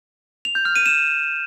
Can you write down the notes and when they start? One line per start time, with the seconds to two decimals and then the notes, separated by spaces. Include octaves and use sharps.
0.45 F7
0.55 G6
0.65 F6
0.76 D#7
0.86 E7